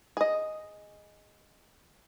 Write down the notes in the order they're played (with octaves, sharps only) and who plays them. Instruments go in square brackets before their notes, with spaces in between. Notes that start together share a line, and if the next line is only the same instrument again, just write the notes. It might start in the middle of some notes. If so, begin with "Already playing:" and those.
[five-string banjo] G#4 D#5